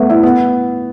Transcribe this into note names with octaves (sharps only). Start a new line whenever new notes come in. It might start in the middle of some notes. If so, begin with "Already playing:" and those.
Already playing: A3 B3
E4
B3